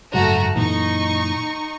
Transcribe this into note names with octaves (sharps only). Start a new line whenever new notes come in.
F#1 G#2 F#3 A3 F#4 A#5
F#2 A#2 E3 D#4 C#6